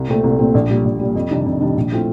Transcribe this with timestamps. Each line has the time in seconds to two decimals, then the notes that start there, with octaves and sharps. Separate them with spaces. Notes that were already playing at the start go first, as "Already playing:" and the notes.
Already playing: C2
0.08 A#2 A3 C4
0.24 C2
0.39 A#2 A3 C4
0.54 A#1
0.70 A#2 G3
0.85 A#1
0.99 A#2 G3
1.15 F2
1.30 C3 D#3 G3 D4
1.46 F2
1.61 C3 D#3 G3 D4
1.77 A#1
1.91 A2 A3 C4 F4